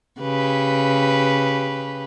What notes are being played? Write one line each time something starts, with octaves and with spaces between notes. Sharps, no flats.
C#3 G4 B4